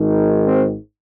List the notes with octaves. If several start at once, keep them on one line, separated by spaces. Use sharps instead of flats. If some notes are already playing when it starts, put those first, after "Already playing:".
Already playing: G#1 G#2 D#3
C4